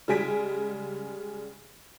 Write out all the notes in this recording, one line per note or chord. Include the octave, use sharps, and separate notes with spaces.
C#3 G3 G#3 G#5 B6 D7